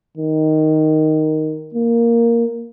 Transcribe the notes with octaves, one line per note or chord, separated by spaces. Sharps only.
D#3
A#3